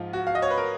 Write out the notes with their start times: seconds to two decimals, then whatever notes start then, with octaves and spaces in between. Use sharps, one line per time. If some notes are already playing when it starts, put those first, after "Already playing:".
Already playing: G#2 F3 F4
0.13 F#4
0.27 F5
0.35 D#5
0.42 C#5
0.50 B4
0.58 A#4